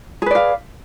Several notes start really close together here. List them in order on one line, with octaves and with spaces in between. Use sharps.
G#4 B4 D5 F5